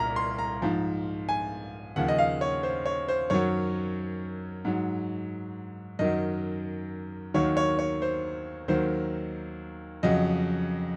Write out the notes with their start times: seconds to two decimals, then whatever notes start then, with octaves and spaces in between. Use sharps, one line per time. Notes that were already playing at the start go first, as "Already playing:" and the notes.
Already playing: C2 A#2 A#5
0.16 C6
0.38 A#5
0.62 G#2 F3
1.29 G#5
1.96 D#2 C#3 F3 F#5
2.08 D#5
2.18 F5
2.41 C#5
2.63 C5
2.85 C#5
3.08 C5
3.30 F#2 D#3 F#3 C#5
4.65 G#2 F#3
5.99 F#2 D#3 F#3 D#5
7.34 D#2 D#3 F#3 C#5
7.57 C#5
7.79 C#5
8.02 C5
8.68 D#2 D#3 F#3 C5
10.03 F2 C#3 F#3 D#5